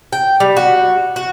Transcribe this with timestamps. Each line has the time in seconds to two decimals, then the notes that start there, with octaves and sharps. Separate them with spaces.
0.13 G5
0.40 G3
0.57 F#4
1.16 F#4